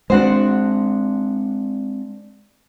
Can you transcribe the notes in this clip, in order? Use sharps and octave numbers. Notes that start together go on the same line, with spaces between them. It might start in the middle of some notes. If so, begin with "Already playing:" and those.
G#3 C4 D4 F#4 C5